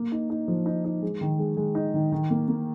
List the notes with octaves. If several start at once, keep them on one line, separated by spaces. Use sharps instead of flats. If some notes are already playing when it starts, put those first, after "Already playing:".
Already playing: A#3
D#4
D#4
F3
D#4
D#4
G#3
D#3
G#3
G#3
D#4
D#3
D#3
A#3
A#3